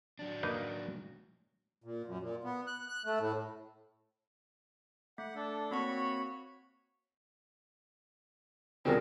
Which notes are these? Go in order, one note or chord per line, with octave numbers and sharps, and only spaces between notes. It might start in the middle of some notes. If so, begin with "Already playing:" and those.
F#3 D4
A#3 D#4 B4
A#2
F#2
A#2
B3
F#6
F#6
A3
A2
A3 F#5
D4 A4
A#3 C4 F#4 C#5 B5 C#6
B2 D3 F3 G3 C4 G#4 A#4 G5